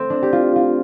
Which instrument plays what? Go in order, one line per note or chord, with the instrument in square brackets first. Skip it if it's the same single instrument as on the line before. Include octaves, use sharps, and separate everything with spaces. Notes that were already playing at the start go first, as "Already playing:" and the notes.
Already playing: [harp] A3 C4
D4
G4
F4
F4